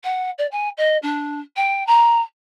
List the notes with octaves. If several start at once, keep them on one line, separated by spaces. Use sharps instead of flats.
F#5
D5
G#5
D#5
D4
G5
A#5